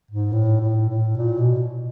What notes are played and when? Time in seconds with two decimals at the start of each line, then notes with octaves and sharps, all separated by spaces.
0.11 G#2
0.32 A2
0.60 A2
0.89 A2
1.17 A#2
1.38 B2